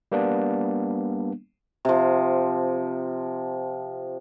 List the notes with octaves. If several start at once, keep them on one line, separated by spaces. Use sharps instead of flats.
G3 A#3 B3 D4
C3 F3